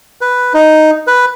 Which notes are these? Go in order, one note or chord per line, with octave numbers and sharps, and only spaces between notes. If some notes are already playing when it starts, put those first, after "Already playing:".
B4
D#4
B4